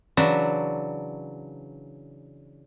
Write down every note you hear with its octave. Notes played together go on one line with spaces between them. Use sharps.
C#3 E3 F#3 D4 E5 A#5